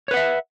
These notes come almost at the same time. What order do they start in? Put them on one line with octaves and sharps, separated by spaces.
C#5 B4 F#5 E5